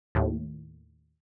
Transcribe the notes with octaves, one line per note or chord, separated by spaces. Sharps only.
D#2 A2